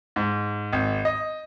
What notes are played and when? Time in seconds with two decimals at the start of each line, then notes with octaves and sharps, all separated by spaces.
0.16 G#2
0.73 G#1
1.05 D#5